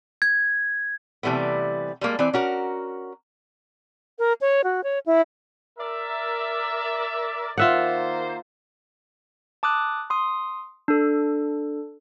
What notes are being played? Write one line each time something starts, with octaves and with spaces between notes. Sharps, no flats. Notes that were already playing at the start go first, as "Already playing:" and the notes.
G#6
C3 E3 G3 A3 B3
G3 G#3 A#3
E3 C4 D5
C#4 F#4 A#4
A#4
C#5
F#4
C#5
E4
A#4 D5 E5
D#3 A#3 F4 C5 E5 F#5
A5 D6 D#6 F#6
C6 D#6
D4 A4